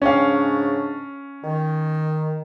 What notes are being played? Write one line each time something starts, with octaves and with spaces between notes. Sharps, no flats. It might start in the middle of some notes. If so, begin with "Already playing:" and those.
G#2 C#3 C#4 D4 F5
D#3